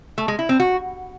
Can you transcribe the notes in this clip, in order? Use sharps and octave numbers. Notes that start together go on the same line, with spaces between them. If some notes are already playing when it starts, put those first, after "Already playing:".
A3
G#3
E4
C4
F#4